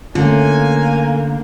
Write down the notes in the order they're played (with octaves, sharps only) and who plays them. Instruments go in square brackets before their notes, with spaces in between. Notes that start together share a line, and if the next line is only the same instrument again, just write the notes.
[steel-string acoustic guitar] D3 [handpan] A3 C#4 F4 [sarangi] A#3 [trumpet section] G#5